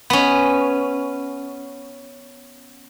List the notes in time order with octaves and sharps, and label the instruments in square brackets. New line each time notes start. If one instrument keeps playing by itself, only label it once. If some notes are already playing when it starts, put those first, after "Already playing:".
[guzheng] B3 C#4